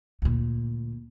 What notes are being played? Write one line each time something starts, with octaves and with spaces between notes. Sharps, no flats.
D2 A#2